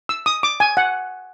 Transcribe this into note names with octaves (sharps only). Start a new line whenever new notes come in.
E6
D#6
D6
G#5
F#5